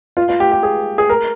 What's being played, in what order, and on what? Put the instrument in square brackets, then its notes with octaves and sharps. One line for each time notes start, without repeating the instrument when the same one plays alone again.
[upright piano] F4
F4
G4
G4
G#4
G#4
A#4